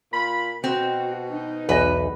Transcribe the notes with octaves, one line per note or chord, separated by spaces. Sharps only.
A#2 F4 B5
B2 C4 F#4
D#4
B1 E2 B4 D#5